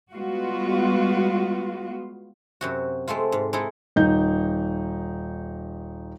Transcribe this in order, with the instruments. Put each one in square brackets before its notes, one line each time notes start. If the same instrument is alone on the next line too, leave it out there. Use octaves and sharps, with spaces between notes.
[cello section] G3 G#3 B3 F4 F#4
[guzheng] F#2 C3 F#4
G#3 A3 C4 F4
G#2
G#3 D#4 E4 A4
[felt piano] D#1 D#4 G6